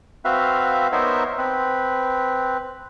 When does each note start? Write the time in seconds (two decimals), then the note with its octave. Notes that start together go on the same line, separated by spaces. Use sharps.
0.25 C4 F#4 B4 E5 F5
0.92 B3 D#4 A#4 C5 C#5 E5
1.38 C4 B4